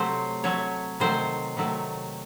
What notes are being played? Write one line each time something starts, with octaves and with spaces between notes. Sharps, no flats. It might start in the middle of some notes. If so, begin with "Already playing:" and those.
Already playing: C3 F#3 A3 C5
C3 F#3 A3 C#5
C3 D#3 F#3 A3 C5
C3 D#3 F#3 A3